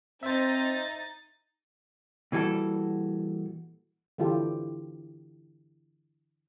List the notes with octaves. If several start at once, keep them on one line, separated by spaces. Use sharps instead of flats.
C4 D#4 C5 E5 A6
A#2 E3 G3 F#4 A4
D3 E3 E4 F4 G4 A4